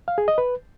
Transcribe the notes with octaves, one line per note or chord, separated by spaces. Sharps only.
F5
G#4
D#5
B4